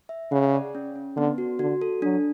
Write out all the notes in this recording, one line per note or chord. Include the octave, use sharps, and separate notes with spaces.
E5
C#3 F#5
D5
C#4
C#4
D3 B3
F#4
D3 F#4
A4
F#3 D4